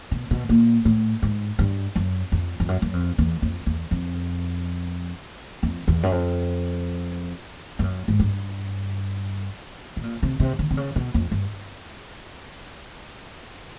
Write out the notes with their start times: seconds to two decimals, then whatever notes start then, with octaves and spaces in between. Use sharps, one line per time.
0.11 B2
0.31 B2
0.49 A#2
0.85 A2
1.22 G#2
1.59 G2
1.96 F#2
2.32 F2
2.60 F2
2.68 F#2
2.82 F#2
2.93 F2
3.18 E2
3.42 F2
3.67 E2
3.91 F2
5.63 F2
5.88 E2
6.03 F#2
6.12 F2
7.79 G2
7.84 F#2
8.08 G#2
8.19 G2
9.97 B2
10.03 A#2
10.23 C3
10.40 C3
10.59 D3
10.71 C3
10.77 C#3
10.96 B2
11.14 F2
11.32 G2